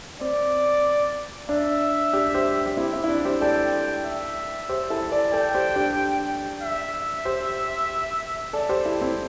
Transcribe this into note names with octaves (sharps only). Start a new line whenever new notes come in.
C4 D5
D4 E5
D4 G4
G4 C5
G4
C4 E4
C4 E4
E4
D4
G4 C5
A4 D5 G5
G5
E5
G4 C5
E4 A4
A4 D5
A4 D5 G5
G4 C5
D4 G4
E5
G4 C5
A4 D5
G4 C5
E4 A4
C4 E4